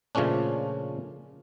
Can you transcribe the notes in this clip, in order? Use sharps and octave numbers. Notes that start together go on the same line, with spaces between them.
A#2 C#3 F3 A3 C#4 D4